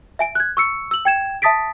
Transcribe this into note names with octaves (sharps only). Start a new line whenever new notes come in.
E5 G#5 D7
F#6 G#6
C#6 E6 C#7
E6 F#7
G5 G#6 E7
E5 A5 D#6 A6 B6 D7